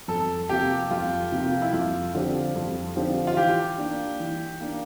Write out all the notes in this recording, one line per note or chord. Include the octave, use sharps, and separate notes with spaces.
F2 A4
C3 F3 A#3 F4 G4
F2 F4
C3 F3 A#3 F4
E4
F2 F4
D3 F3 C4 G4
F2
D3 F3 C4 G4
F4
E3 G4
A#3 D4
E3
A#3 D4